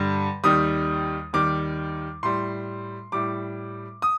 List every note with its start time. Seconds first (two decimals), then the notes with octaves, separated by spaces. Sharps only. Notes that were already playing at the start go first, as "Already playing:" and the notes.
Already playing: G2 D3 G3
0.44 D#2 D#3 G3 D#6
1.33 D#2 D#3 G3 D6
2.23 A2 G3 C6
3.12 A2 G3 D6
4.02 D#6